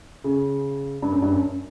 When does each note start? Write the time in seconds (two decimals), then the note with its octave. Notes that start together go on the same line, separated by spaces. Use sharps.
0.24 C#3
1.02 G2
1.12 F#2
1.22 G2
1.32 F#2